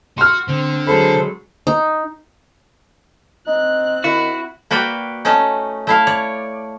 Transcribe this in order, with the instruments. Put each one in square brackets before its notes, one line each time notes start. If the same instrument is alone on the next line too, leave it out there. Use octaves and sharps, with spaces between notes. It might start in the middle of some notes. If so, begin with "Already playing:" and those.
[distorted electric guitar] F#4 [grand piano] C6 F6
[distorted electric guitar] D3 [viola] C4
[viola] F#3 G#3 [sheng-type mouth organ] A4 C5 [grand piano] B5
[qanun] D#4
[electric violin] C4 F#6 [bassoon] D#4
[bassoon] D#3 [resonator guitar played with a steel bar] E4 [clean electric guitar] F#4
[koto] A#3 F#4 B4 D5 G5
A3 C#4 D#4
A3 E4 F5
C#5 D5